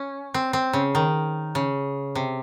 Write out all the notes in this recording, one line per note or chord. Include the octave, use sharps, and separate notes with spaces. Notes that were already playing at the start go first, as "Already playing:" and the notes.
Already playing: C#4
C4
C4
C#3
D#3
C#3
C3